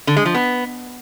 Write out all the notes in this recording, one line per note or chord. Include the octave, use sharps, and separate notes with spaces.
D3
G#3
F3
B3